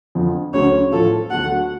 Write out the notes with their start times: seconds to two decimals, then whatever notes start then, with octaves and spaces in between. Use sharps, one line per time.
0.15 F2 D3 F3
0.54 D2 C#3 F#3 A3 C#5
0.92 A2 F3 A3 F4 A4
1.31 D2 D3 F#3 A3 F#5